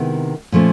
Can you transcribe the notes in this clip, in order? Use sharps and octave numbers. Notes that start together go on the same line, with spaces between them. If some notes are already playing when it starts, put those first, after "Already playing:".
Already playing: C3 D#3 G#3 B3 E4
A#2 F3 A3 C#4